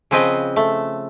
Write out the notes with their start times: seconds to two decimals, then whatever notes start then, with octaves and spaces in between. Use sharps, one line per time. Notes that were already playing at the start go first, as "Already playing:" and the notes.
0.11 C#3 F3 C4 B4 D#5 G5
0.56 A3